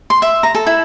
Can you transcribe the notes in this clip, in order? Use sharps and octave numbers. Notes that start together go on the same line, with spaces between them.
C6
E5
A#5
A4
E4